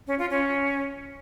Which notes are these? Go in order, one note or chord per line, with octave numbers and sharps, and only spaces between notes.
C#4
F4
C#4